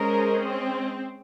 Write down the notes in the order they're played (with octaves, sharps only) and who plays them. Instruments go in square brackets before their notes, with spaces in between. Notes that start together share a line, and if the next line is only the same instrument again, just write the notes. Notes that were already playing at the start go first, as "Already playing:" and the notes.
Already playing: [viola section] G#3 C#4 G#4 C5 D#5 [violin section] A#4
[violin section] C4